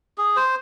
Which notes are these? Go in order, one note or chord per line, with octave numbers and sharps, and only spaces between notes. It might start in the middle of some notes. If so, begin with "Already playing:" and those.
G#4
C5